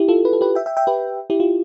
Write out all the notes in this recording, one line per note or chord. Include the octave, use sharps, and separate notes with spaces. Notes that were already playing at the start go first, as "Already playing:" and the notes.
Already playing: E4 G4
F4 A4
B4
A4
G4 B4
E5 G5
E5 G5
E5 G5
G4 B4
E4 G4
F4